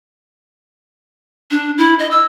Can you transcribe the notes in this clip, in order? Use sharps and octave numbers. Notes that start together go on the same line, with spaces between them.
D4
E4
D#5
E6